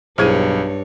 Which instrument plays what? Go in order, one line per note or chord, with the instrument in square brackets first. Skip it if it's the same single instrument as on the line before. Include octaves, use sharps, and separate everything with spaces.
[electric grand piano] B1 G#6 D#7 [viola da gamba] G2 C#5 [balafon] E4 G#4 C5